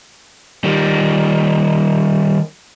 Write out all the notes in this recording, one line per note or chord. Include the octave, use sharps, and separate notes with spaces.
D#3 G3